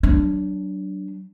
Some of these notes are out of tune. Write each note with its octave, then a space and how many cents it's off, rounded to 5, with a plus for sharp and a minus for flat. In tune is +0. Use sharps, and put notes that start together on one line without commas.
F#3 +30 D4 +0